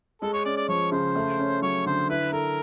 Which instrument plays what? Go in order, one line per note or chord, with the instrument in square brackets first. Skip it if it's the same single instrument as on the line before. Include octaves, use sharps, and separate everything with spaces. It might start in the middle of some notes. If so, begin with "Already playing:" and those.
[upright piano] G#3 [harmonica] A4
[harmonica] C#5
[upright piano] C#4 [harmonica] D5
[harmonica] D5
[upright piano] F3 [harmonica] C#5
[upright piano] C#3 [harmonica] C5
[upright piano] A3
C#4
[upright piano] F#3 [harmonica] C#5
[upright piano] D3 [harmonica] C5
[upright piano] E4 [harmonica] B4
[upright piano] A4 [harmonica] A#4